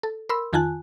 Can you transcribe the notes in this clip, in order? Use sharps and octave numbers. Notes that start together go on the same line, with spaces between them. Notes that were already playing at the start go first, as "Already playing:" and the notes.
A4
A#4 B5 C6 E6
F2 D#3 F4 G#5 A5 F#6